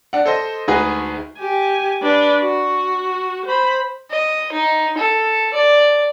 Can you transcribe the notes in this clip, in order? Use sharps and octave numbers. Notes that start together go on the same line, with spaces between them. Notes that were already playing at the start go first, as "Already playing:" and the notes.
D4 F#5
A4 C5 D#5
D2 G#3 D#4 F#4 G#4 B4
G4 G#5
D4 B4
F#4
C5 B5
D#5
D#4
A4
D5